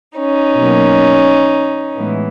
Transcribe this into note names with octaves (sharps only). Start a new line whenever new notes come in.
C#4 D#4
B2 F#3 A#3
A2 E3 G#3 B3